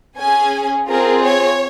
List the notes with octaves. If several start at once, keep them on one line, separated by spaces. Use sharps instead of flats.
C#4 G#4 G#5
C4 F4 G#4 A#4
C#5